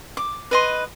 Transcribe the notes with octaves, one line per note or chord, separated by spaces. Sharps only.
D6
B4 D#5 C6